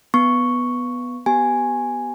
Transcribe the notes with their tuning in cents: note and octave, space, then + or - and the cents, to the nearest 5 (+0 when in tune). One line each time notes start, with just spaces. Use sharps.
B3 +0 C#6 +0
B3 +0 G4 -25 G#5 +0